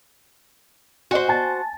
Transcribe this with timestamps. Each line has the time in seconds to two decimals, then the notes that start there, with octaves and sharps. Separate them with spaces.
1.11 F#4 C5 D5 D#5 G#5
1.28 G#5 A5 A6